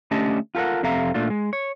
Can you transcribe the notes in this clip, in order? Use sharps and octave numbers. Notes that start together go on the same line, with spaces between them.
D3 A3 C#4 G4 D#5 A5
F4 G4 A4 A#4 F#5
F2 C3 A4 E5 F5 A#5
A#2 A3 D4 F4
G#3
C#5